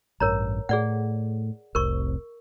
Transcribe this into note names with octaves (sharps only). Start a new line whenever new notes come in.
A1 G2 A#4 C#5 A#5
A2 G#4 D5 F#5
F1 C2 C3 A#4 C#6